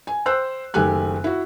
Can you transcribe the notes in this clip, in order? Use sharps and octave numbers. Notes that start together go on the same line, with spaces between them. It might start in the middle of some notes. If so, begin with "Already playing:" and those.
G#5
C5 G5 E6 F#6
F#1 D#3 A3 G4 G#5 F#6
E4 F#4